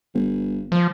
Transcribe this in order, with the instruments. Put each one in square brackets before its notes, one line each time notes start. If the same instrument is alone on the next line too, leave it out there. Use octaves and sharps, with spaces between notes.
[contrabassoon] G1
[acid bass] F3